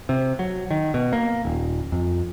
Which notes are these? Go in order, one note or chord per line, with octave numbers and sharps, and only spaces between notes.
C3
F#3
D#3
B2
A#3
D#1
F2